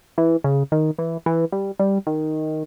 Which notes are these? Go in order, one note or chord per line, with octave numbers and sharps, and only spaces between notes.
E3
C#3
D#3
E3
E3
G3
G3
D#3